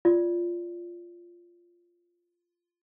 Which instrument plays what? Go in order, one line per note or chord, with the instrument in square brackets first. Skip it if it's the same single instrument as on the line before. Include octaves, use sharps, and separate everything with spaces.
[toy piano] F4 D5